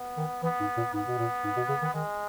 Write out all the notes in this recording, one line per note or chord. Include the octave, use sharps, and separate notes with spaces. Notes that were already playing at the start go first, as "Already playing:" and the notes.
Already playing: B3
D#3
E3 B3
G#2
A#2
G#2 B3
B2
A#2
G#2
B2
C#3
D#3
D#3 G#3